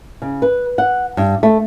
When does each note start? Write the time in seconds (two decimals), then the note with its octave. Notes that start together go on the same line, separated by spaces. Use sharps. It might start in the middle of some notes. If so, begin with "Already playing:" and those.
0.22 C#3
0.42 B4
0.78 F#5
1.17 G2
1.43 A3